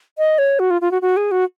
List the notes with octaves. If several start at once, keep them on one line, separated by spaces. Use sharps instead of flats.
D#5
C#5
F#4
F4
F4
F#4
F#4
G#4
F#4